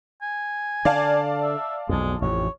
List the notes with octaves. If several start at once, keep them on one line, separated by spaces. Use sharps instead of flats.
G#5
D3 D5 F5 A5
E5
B1 F2 G#3
A1 F2 C#5